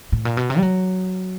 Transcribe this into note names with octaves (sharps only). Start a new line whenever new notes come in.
A2
A#2
B2
C3
G3
F#3